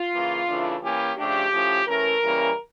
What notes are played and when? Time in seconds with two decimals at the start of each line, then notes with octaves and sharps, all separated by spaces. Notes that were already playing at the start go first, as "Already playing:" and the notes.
Already playing: F4
0.14 C#3 E3 A#3
0.48 C#3 E3 A3 D4
0.83 E3 A#3 C#4 G4
1.17 C#3 F3 A3 D4 G4
1.52 A2 F3 C#4
1.87 E3 A3 C#4 A#4
2.21 C#3 E3 G3 A#3 C#4